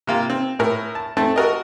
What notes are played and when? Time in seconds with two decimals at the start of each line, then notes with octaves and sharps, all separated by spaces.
0.07 C3 A#3 F4
0.30 C4
0.59 A2 A#4
0.95 A5
1.17 A3 C4 A5
1.36 F#4 A#4 D#5